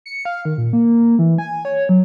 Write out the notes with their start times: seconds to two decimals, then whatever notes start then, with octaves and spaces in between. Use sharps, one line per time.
0.06 C#7
0.25 F5
0.45 D#3
0.58 A#2
0.73 A#3
1.19 E3
1.38 G#5
1.65 C#5
1.89 F#3